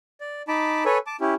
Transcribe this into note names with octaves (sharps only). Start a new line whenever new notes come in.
D5
D#4 A5 B5 D6
A4 B4 C#5 G#5
A5 D6
C#4 E4 G4